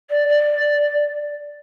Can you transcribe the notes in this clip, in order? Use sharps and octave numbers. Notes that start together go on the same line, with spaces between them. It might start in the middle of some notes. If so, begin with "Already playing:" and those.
D5
D5